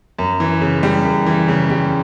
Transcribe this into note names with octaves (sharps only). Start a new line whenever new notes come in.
F#2
E3
C#3
G3
F#2
E3
C#3
G3